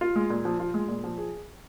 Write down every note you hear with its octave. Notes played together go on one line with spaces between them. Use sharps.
F4
G#3
A#2
F3
F4
G#3
A#2
F3
G#4